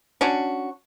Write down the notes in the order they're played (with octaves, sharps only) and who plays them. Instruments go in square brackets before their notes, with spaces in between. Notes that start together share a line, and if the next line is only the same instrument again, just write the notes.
[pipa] C#4 D4 F#4